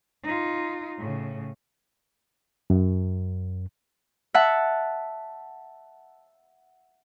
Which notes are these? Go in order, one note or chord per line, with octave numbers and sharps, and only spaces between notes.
D#4 F4
A2 C#3
F#2
E5 F#5 A5